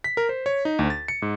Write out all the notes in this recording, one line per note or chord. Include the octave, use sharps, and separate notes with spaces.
B6
A#4
C5
C#5
D#4
D2
A6
C#7
G#2